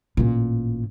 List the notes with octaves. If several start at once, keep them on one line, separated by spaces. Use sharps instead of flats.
A1 A#2